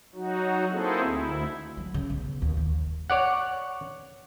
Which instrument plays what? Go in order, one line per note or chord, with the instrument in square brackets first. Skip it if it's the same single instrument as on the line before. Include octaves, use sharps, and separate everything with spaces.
[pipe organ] F#3 D#4 F#4
A#3 C4 D#4 E4 G#4 A4
D2 E4
[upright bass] F#3
C#3
B1
D#2
D#2
[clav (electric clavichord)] C#5 D5 F#5